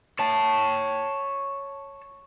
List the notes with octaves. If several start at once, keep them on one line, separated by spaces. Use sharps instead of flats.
C#5 A5